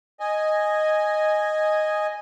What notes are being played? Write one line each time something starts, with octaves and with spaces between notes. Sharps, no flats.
D#5 G#5